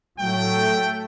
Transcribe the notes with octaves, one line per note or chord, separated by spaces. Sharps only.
A2 F#3 A3 G5